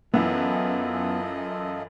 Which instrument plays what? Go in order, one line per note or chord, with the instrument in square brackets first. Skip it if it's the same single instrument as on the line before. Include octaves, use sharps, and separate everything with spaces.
[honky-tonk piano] F#2 E3 [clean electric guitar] B3 [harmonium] F4 A4 D#5